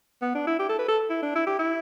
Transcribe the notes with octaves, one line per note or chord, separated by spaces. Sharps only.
B3
D4
E4
G4
A4
B4
A4
E4
D4
E4
G4
E4